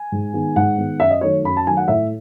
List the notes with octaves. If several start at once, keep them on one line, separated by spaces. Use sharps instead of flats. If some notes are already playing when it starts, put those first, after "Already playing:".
Already playing: G#5
G#2
D#3 G#3 B3
G#2 F#5
D#3 G#3 B3
F#2 E5
D#5
D#3 F#3 A3 C#5
F#2 B5
A5
D#3 F#3 A3 G#5
F#5
A2 E5